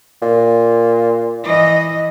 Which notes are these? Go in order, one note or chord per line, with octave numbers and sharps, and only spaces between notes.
A#2
E3 D#5